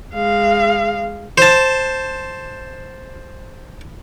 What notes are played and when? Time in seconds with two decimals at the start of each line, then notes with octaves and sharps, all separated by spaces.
0.14 G#3 F5
1.38 C5 A5